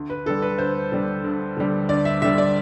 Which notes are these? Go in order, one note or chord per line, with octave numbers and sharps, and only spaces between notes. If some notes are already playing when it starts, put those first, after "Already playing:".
Already playing: D2
B4
D3 G3 A4
B4
D2 C5
D3 G3
D2
D3 G3
D2 D5
E5
D3 G3 E5
D5